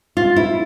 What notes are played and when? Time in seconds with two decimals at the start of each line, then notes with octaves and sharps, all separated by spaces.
0.17 F4
0.36 E4